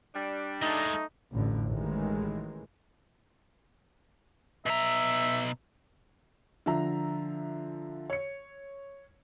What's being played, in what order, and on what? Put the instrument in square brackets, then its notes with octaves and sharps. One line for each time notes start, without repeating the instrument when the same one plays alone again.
[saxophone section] G3 D4
[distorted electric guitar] G#3 A4 [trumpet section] A3 D#4
[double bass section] A1 F2 D3
A1 A2 D#3 E3 G#3
[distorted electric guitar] B2 A#5 [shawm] E5
[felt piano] D3 F3 E5 A#5
C#5 C#7